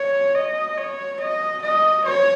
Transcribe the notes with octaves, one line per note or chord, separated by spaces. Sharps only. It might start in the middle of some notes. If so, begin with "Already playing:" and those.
Already playing: C#5
D#5
C#5
D#5
D#5
C#5